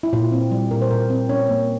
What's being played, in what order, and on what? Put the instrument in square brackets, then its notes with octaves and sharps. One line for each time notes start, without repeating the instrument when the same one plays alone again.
[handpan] E4
A#2 F4
C4
G3
A#2 A#4
C5
A#2 A#4
C4
C#4 C#5
A#3